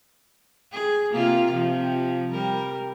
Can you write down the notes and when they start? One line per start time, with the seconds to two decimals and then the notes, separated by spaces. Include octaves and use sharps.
0.72 G#4
1.11 C3 A#3 F4
1.51 C3 F3
2.30 G3 A#4